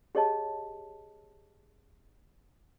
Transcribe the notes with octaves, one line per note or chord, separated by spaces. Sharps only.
G4 G#4 C#5 D#5 A5